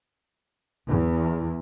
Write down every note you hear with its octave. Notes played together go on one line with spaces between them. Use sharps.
E2